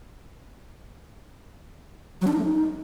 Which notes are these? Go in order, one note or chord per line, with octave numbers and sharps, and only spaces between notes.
F#3
D4
D#4
A3
D#4